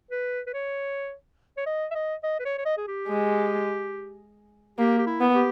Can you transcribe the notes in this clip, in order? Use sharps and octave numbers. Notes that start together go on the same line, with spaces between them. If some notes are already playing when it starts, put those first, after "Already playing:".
B4
B4
C#5
C#5
D#5
E5
D#5
D#5
B4
C#5
C#5
D#5
G#4
G4
G#3
A#3 G4
G4
E4
B3
G4